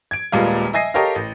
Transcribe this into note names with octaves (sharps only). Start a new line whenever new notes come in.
G#6 D7
D#1 A#2 G3 G#3 B3 F5
D#5 E5 G#5 A#6 C7
G4 A4 A#4 C#5 D#5 F5
A1